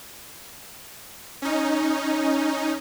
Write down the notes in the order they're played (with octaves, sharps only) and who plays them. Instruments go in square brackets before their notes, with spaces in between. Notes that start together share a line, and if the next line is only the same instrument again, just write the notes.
[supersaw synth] C#4 D#4